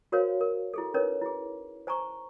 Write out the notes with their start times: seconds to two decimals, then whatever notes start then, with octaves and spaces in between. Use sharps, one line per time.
0.12 F#4 A#4 C5 C#5 F5
0.41 A#4
0.74 E4 G#4 A4
0.94 C#4 D#4 A#4 B4 C#5
1.22 E4 G#4
1.87 C5 G#5 A#5 C#6